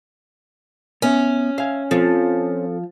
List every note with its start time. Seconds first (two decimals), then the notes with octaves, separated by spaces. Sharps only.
1.02 B3 C#4 E5
1.58 E5 F5 G#5
1.91 F3 C4 A4 C5